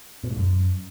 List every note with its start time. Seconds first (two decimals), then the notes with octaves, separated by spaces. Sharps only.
0.24 B2
0.31 G#2
0.38 F#2